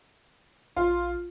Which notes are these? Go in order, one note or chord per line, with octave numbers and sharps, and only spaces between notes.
A#1 F4